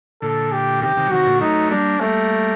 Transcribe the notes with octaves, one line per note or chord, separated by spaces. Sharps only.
A#2 D3 A4
G4
C3 D#3 G4
C3 D#3
F#3
C3 D#3 F#4
A#2 D3
F#3 A3 D#4
G3 A#3 D4
G3 A3 A#3